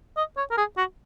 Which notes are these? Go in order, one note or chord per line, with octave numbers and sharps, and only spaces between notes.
D#5
C#5
A#4
G#4
F#4